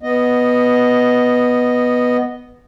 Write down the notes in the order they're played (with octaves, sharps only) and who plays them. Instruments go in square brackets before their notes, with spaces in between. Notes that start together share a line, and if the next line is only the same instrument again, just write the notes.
[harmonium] B3 D#5